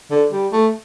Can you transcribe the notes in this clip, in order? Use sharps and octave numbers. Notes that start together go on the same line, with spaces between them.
D3
G3
A3